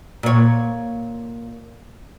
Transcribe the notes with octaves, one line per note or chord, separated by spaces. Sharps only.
A#2 C#5